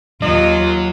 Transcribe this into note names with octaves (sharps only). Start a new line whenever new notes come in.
D#2 F#3 F4 D#5